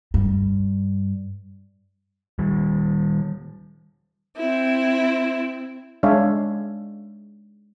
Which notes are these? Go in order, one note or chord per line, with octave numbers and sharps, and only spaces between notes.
G2
D#3 G3
C4 E4
G#3 D4 C#5 E5 F5